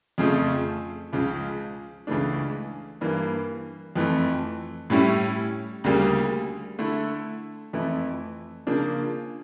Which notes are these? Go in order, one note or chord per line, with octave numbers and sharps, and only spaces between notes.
F2 C#3 F3 A3
C#2 C#3 F3
C#2 C#3 E3 A3 D4
G2 E3 A#3
F2 E3 A3
A2 G3 C#4 E4
D2 C#3 G3 A#3
D3 A3 E4
F2 E3 A3 E4
C#3 F3 A#3 D4